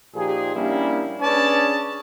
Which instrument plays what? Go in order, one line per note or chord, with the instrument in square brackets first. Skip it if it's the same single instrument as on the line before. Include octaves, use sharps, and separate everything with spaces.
[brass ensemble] A#2 F3 D#4 G4 G#4
G3 A#3 C#4 D4 E4
C#4 D4 G#4 B4 D5 A5